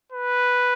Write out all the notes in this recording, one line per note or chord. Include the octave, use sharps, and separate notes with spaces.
B4